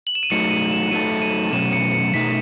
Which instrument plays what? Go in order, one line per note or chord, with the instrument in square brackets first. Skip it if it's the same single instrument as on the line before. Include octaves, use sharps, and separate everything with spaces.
[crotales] F#7
E7
D#7
[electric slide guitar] F#3 A3 D#4 [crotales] C#7
[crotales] D#7
E7
[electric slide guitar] F#3 A3 D#4 A4 [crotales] D#7
[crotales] D#7
[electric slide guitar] B2 F#3 A3 C#4 [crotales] E7
[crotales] C#7
C#7
[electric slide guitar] B2 A3 D#4 [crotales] B6